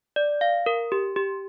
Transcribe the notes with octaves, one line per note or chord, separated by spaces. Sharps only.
D5
F5
A#4
G4
G4